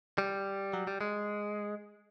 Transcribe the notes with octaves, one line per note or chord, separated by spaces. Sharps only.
G3
F#3
G3
G#3